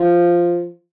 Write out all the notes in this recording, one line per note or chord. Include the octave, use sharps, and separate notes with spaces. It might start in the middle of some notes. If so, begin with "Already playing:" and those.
Already playing: F3